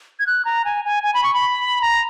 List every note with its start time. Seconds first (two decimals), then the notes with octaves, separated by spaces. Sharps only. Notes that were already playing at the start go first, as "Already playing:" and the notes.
0.19 G#6
0.27 F#6
0.45 A#5
0.65 G#5
0.85 G#5
1.03 G#5
1.14 B5
1.24 C#6
1.34 B5
1.82 A#5